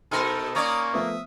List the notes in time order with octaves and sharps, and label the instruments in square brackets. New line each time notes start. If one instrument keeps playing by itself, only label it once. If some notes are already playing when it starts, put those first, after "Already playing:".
[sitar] B2 D#4 A#4 [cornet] A4 [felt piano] B5 C6 F6
[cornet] A#3 [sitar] C#4 C#5 D5 [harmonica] A#5 D#6
[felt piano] F3 A3 B3 [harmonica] E5 D#6